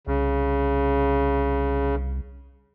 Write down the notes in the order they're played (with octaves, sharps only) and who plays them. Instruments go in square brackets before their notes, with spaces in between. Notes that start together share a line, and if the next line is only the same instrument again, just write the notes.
[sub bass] C2 [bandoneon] C#3